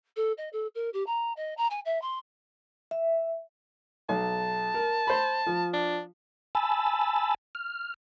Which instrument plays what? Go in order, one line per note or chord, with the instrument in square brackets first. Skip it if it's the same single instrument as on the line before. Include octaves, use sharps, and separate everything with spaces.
[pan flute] A4
D#5
A4
A#4
G4
A#5
D#5
A#5
G#5
E5
C6
[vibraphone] E5
[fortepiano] B1 [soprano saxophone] A5
[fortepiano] A#4
C5 B5
F3
[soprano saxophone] D4
[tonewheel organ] G#5 A5 B5 E6 A6
F6